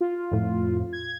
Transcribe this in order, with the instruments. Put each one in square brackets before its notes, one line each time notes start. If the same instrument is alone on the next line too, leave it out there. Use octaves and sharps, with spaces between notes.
[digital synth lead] F4
[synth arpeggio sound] F2 A2
[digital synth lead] G#6